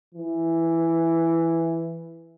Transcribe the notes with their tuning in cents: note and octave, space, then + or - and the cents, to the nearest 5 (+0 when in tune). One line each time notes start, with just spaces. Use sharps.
E3 +5